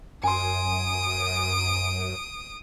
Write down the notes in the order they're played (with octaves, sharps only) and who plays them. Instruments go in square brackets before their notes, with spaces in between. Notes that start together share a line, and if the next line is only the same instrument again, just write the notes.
[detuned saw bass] F#2 [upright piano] G#5 C6 [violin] D#6 D7